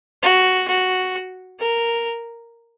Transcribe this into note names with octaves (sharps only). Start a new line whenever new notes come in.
F#4
F#4
A#4